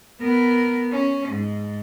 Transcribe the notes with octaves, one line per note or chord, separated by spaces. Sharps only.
B3 A#4
C#4
G#2